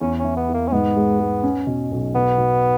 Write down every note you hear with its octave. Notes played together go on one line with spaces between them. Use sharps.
E2 C#4
E3 C#4
B3
E2
A#3
C#4
G#2 B3
G#3
G#3
C#4
B2
B1
B2 B3
B2